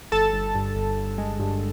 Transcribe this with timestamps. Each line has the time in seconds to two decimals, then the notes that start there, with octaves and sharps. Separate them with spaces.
0.12 G1 A4 A5
0.33 G1
0.55 G2
0.76 G1
0.97 G1
1.18 G#3
1.40 G2